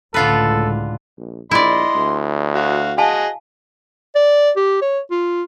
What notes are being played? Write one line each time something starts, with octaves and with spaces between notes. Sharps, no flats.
C#2 A2 D3 G#3 F4 A4 B4
A#1
A#1 E4 D5 D#5 C6
D2
F#4 F5
F#4 G#4 D#5 F5 G#5 A5
D5
G4
C#5
F4